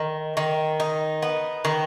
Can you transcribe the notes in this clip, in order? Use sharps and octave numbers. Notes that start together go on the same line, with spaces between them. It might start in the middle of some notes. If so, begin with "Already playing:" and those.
Already playing: D#3
D#3
D#4
B3
D#3